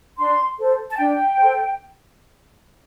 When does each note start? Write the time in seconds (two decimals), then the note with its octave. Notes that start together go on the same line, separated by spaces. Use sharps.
0.17 D4 C6
0.58 A4 C5
0.90 A5
0.98 D4 G5
1.38 A4 C5